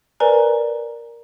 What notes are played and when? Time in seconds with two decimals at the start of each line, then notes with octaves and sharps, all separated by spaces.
0.20 A#4 B4 D5 G#5 A#5